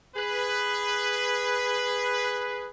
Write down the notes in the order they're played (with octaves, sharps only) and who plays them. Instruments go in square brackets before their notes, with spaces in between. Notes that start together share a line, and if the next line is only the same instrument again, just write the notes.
[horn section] G#4 B4